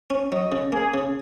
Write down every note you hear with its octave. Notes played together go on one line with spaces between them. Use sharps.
C#4
F#3 D#5
C#3
A#3 G#4
C#3